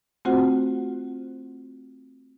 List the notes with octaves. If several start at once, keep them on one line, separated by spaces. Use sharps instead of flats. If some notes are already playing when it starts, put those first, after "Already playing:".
A3 C4 F4 F#4 C5 F#5